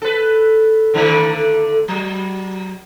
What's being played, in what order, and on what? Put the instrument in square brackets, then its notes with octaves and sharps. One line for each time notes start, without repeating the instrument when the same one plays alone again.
[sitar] A4 B4
D3 D#3 A3
F#3